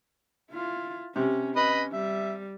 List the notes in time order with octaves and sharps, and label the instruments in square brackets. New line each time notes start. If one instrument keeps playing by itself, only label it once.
[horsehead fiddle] E4 F4
[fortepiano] C3 [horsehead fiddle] C#4
[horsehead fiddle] C#4 [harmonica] B4 D#5 B5
[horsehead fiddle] G3 [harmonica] E5